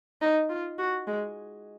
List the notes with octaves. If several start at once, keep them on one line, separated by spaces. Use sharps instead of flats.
D#4
F4
F#4
G#3